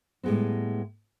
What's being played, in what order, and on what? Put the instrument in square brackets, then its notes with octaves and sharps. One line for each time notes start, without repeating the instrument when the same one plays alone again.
[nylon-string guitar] A2 G3 G#3 B3 C4